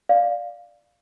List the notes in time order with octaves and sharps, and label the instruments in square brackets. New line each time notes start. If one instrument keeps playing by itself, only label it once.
[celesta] D5 F5